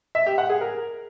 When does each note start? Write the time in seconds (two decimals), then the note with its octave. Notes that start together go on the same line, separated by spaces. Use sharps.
0.15 E5
0.26 G4
0.38 F#5
0.50 G#4
0.61 A#4